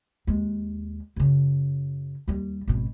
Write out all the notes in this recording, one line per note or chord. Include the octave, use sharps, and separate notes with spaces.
D#2 G#3
F#2 C#3
D#2 G3
G#1 B2